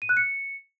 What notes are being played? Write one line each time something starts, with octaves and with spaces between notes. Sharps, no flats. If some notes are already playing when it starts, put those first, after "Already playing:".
D#7
F#6
C#7